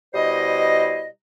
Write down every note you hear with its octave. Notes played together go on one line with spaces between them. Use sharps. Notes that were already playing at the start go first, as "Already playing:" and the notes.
B2 G3 E4 C5 D#5